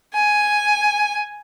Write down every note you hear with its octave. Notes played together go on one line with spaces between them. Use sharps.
G#5